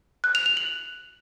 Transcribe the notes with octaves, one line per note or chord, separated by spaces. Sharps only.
F#6
F7
F7
F#7